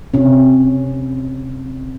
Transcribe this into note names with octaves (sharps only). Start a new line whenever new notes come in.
C3 C#4